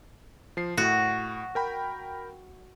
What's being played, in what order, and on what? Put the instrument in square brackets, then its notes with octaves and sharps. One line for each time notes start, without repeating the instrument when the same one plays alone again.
[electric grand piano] F3 C7
[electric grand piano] A2 [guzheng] F#4
[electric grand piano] A#4 G5 B5